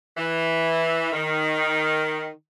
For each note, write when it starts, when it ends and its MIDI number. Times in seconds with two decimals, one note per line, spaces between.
0.18 1.10 52
1.13 2.31 51